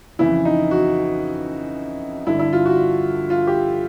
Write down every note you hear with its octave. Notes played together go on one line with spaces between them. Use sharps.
F2 C#3 E3 E4
D#4
F#4
G2 D3 E4
E4
F4
F#4
F4
G4